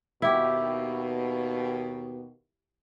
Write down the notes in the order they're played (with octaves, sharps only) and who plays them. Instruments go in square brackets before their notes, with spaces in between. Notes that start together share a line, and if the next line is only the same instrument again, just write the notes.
[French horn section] D#2 B2 [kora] E4 G4